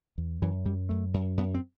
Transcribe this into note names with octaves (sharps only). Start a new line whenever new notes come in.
E2
F#2 E3
F#2 G3
F#2 A3
F#2
F#2 B3
C4